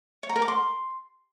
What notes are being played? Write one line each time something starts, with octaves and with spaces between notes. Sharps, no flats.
C#5
A#5
A#4
D6
C6